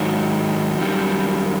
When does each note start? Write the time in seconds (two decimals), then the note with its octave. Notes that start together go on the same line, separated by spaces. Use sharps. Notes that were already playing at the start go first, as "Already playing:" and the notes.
Already playing: G#2 D#3 F#3
0.78 F#2 D#3 G3